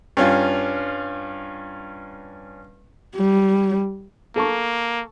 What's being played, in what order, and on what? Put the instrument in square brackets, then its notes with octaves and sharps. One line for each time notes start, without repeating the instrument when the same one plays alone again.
[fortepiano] G2 C#4 F4
[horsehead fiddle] G3
[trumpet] A#3 [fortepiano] A4 A5 C#6